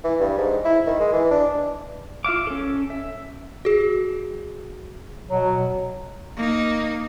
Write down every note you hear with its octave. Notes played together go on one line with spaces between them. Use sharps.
E3
G2
G#2
E4
D#3
G#3
E3
D4
F4 E5 F5 D6
C#4 A4
E5
F#4 G#4
B2 F#3
A#3 D#4